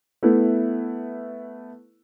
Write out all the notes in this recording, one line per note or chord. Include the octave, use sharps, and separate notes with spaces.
A3 B3 E4